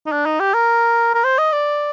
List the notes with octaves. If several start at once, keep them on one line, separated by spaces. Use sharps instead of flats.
D#4
D4
D#4
G4
A#4
A#4
C5
D#5
D5